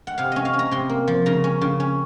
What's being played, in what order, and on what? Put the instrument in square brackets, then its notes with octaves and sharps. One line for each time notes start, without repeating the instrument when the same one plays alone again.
[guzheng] F#5
C3 F5
C#4 D#5
F5
C#4
A#5
C3 C6
A#3
F3
C#3 A#5
C#4
C#3
C#4